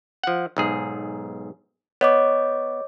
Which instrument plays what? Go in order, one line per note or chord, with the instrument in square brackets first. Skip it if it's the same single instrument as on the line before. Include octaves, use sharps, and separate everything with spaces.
[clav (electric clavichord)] F3 F#5
B1 G#2 G#4
[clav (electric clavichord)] B3 [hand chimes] C#5 D#5 D6